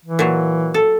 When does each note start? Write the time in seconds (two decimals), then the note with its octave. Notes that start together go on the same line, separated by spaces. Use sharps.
0.05 E3
0.19 A#2 F#3
0.74 A4